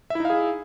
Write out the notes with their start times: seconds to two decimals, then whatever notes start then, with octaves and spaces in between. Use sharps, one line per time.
0.10 E5
0.15 E4
0.20 D#4
0.25 F5
0.30 G#4